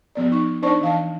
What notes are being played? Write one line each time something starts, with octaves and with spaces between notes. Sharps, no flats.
F3 B3 D5
D#4 C#6
D4 D#4 C5 D5 A5 C#6
E3 F5 A5